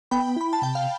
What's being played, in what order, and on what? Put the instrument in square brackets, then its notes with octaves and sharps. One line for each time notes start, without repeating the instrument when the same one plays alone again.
[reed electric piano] B3 [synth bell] G5 B5
[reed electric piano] E4 [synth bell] B5
[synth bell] A5
[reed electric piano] C3 [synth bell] G5
[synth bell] F5